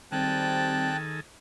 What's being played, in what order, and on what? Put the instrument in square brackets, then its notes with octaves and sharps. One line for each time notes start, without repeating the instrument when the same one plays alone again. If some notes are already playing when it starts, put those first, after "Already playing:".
[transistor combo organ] D#3 G#4 A4 [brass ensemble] G3 C4 [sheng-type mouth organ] G5 A5 F#6